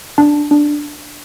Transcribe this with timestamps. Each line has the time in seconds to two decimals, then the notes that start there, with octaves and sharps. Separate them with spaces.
0.18 D4 A5
0.51 D4